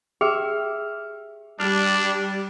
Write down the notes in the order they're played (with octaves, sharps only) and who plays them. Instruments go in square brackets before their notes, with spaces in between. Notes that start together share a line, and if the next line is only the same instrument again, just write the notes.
[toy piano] G4 G#4 G5 [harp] E5 F6
[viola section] G3 [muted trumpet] D4 [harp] F6